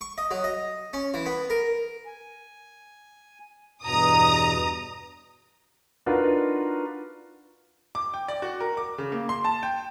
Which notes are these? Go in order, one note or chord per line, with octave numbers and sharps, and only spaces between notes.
C#6
D#5
F#3
D#5
C#4
E3
B3
A#4
G#5
E2 G2 B2 A#5 D#6
D4 D#4 F4 F#4 A#4 B4
D6
G5
D5
F#4
A#4
D6
C#3
A#3
C6
A5
G5